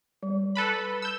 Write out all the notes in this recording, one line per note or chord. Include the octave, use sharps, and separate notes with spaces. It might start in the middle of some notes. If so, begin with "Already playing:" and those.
G3
A4 B4 B5
E6 G6